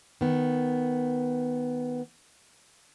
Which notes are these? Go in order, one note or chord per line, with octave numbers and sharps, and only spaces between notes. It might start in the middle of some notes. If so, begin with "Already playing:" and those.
D#3 B3